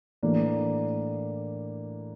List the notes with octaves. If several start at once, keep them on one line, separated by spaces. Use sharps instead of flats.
A2 E3 A#3 D4